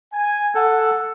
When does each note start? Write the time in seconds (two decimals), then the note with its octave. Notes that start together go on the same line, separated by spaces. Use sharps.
0.13 G#5
0.55 A4 F#5